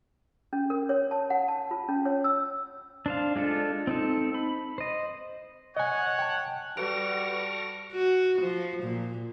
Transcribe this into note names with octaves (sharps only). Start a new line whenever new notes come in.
C#4
A#4
C#5
A5
F#5
A5
F4
C#4
C#5
E6
D4 C5 F5
G#3 D4 F4 A4
C4 D#4 A4
B5
C5 D#5
C#5 D#5 F#5 G#5
G5 A5
G3 F#4 A4 B4 C#6 F6 A#6 D7
F#4
F3
A#2